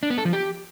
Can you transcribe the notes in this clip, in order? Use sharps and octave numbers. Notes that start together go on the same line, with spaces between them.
D4
B3
A4
F3
G4